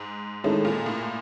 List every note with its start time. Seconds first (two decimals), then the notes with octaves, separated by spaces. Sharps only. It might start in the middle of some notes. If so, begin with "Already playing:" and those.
Already playing: G#2
0.44 A2 D#3 G#3 C#4 E4 A4
0.65 A#2
0.86 A2